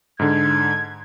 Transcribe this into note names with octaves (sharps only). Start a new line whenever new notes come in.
G#2 D3 G#6